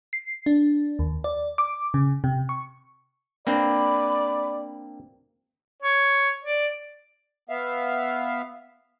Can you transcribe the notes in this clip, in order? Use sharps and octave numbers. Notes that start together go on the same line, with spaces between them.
C7
D4
D#2
D5
D6
C#3
C3
C#6
A#3 C4 D4 D5 B5
C#5
D5
B3 E5 F5